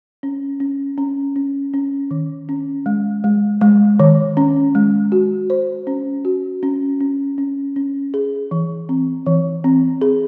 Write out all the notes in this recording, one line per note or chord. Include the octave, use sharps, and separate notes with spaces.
C#4
C#4
C#4
C#4
C#4
D#3
C#4
G#3
G#3
G#3
D#3
C#4
G#3
F#4
C5
C#4
F#4
C#4
C#4
C#4
C#4
G#4
E3
C4
E3
C4
G#4